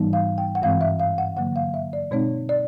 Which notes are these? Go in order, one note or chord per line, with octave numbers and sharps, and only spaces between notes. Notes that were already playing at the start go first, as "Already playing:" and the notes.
Already playing: G#2 E3 G3 B3 D#4
F5
G5
F#5
G2 E3 G#3 C4 F5
E5
F5
F#5
D3 F#3 A#3 F#5
F5
E5
D5
B2 G#3 C4 D#4 C#5
D5